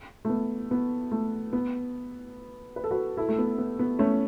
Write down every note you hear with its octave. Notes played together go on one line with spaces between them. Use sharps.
A3
B3
B3
A3
B3
B4
A4
F#4 B4
E4 A4
A3
B3
B3
B3
A3 C#4